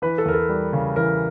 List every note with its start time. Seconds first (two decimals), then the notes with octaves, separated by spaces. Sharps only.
0.02 E3 B4
0.18 A4
0.26 E2 A#4
0.34 A4
0.49 G3
0.73 C#3
0.96 E3 A#4